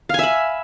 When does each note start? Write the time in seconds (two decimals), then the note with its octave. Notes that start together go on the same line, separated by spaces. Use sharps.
0.09 F5
0.14 G#5
0.19 E5
0.23 B5